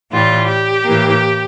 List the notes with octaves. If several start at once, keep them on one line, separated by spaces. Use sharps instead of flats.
A2 E3 G3 F4
G4
A2 E3 A#3